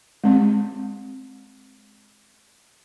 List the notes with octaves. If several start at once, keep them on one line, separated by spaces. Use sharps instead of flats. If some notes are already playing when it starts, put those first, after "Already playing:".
G#3 C4